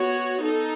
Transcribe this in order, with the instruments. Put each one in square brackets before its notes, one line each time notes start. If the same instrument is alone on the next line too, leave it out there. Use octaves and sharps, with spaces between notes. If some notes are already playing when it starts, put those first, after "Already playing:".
Already playing: [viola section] B3 F#4 C#5
D#4 A4